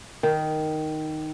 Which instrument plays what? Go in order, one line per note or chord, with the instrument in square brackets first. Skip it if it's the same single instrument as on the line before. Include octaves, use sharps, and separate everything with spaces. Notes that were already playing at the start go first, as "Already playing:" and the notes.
[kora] D#3